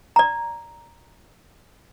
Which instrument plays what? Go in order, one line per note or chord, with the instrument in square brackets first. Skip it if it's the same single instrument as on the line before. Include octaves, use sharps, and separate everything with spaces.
[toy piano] D5 A#5